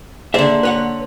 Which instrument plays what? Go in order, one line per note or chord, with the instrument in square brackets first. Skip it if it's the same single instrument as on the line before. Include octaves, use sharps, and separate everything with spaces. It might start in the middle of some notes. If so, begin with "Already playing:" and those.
[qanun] D3 D5 [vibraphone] A#3 C6 [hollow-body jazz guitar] G#4 C5 E5
[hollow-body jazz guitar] B4 C#5 F#5